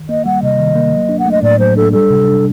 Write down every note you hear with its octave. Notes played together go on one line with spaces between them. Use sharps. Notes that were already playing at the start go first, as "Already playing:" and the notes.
Already playing: D#3
A#3 D#5
G3 F#5
C3 D#5
D#3
A#3
F#3
D4
F#5
A3
D#5
A2 D5
F#3 C5
D4 A4
G3 A4
C3
D4